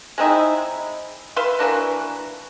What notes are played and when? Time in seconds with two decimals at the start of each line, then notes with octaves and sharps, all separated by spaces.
0.18 G#3 C4 D#4 E4
1.36 B4 E5 F5 C6
1.59 E3 A#3 D4 F#4